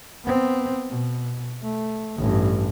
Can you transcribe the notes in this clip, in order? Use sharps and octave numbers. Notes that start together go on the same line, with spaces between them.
B3 C4
B2
A3
A1 G2